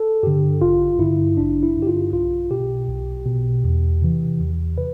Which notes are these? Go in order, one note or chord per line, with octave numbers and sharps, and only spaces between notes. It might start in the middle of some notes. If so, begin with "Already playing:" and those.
Already playing: A4
G2 D3 G4
A1 F4
G2 D3 E4
A1 D4
E4
G2 D3
G4
F4
B1 F4
B2 G4
B1
B2
E2
C3 E3
E2
C3 B4